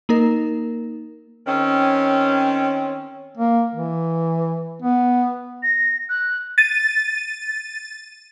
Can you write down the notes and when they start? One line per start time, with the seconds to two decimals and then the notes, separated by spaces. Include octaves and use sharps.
0.09 A#3 D#4 A#4
1.47 D#3 C4 C#4
3.38 A#3
3.75 E3
4.82 B3
5.63 A#6
6.09 F#6
6.58 A6 D#7